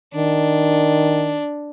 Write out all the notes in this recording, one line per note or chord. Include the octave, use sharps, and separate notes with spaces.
D#3 D4